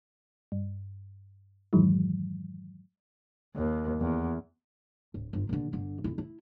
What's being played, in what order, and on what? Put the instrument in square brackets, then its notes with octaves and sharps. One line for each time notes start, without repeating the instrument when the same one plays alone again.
[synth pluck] G2
F2 G#2 D#3 E3 F#3 G#3
[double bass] D#2
E2
[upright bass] D1
G1 F4
A#1 D3
G1 D3
F2 E4
E4